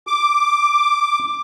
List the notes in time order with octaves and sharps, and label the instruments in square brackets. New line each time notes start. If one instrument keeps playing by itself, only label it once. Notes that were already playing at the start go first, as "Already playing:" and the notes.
[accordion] D6